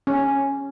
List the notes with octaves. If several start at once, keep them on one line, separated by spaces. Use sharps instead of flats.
C#4